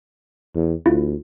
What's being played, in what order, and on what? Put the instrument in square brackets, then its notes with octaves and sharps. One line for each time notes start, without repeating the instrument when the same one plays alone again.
[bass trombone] E2
[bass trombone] D2 [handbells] E4 F4